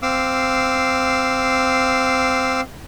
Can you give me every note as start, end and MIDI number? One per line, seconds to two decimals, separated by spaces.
0.02 2.61 60
0.02 2.61 77
0.02 2.61 86
0.02 2.61 88